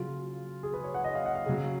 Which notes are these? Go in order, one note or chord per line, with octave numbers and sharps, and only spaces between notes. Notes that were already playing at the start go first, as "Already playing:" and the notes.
Already playing: C#3 F#3 F4
G#4
B4
C#5
F#5
D#5
F5
F#5
F5
C#3 F#3